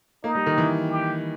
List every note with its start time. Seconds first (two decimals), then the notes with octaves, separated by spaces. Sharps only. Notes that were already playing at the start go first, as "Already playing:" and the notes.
0.24 A#3 D#4
0.35 G3
0.46 D#3
0.58 E3
0.90 G4